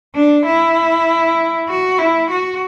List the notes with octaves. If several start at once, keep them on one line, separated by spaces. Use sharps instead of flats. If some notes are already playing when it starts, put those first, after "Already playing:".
D4
E4
F#4
E4
F#4